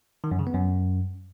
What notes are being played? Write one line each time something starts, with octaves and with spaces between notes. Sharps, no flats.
D#3
F#2
C#3
B3
F#2